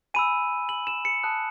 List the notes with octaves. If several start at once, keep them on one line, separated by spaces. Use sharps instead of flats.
G#5 B5 E6 D#7
F#7
E7
C#7
A5 D#6 F#6